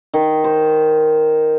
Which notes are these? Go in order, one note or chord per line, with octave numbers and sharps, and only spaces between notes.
D#3
C5